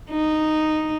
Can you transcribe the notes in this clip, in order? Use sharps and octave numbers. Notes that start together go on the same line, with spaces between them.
D#4